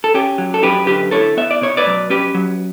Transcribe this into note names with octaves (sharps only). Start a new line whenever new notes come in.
A4
C#4 G4
F#3
A4
F#2 G4 B4
D3 G4 B4
E4 A4 C#5
B3 E5
D5
B2 C#5
B4 D5
F#3
C#4 G4 B4
F#3